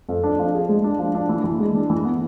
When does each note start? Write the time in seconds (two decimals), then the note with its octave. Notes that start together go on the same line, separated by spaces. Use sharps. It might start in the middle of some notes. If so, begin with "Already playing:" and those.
0.09 F2
0.24 D4
0.39 F3
0.54 G#4
0.69 G#3
0.84 D4
0.99 F3
1.15 D4
1.29 E3
1.44 E3
1.60 G#3
1.75 D4
1.90 E3
2.05 B3